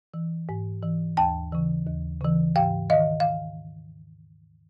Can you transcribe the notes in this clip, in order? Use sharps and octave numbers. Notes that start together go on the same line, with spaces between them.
E3
G#2
E3
D#2 G5 A5
C#3 E3
D#2
C#3 E3
G#2 F5 G5
D#3 D#5 F5
F5